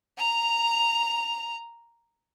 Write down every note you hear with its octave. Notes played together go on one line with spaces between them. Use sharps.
A#5 F7